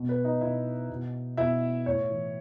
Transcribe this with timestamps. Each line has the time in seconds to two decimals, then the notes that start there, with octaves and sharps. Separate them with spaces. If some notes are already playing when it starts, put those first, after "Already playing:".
Already playing: B2
0.09 B4
0.24 D#4 D#5
0.41 B2 E4 E5
0.89 B2
1.37 B2 E4 E5
1.86 A2 C#5
2.10 E3